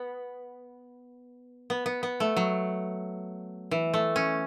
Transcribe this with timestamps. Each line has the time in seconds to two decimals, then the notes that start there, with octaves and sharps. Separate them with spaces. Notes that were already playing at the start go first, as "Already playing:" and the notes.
Already playing: B3
1.70 B3
1.86 B3
2.03 B3
2.20 A3
2.37 F#3
3.71 E3
3.94 A3
4.16 C#4